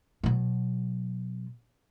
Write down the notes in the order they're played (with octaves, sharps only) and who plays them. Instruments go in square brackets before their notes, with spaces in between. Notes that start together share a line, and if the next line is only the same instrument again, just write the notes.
[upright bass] B2 F#3